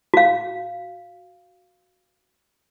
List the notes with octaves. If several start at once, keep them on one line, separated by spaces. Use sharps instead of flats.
F#4 F5